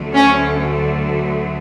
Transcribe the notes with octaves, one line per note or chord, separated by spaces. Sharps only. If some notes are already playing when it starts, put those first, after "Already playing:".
Already playing: D2 D3 F#3 A3
C#4